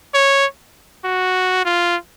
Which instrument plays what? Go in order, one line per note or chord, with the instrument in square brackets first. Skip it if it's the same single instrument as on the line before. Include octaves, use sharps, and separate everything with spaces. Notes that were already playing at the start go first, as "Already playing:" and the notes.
[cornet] C#5
F#4
F4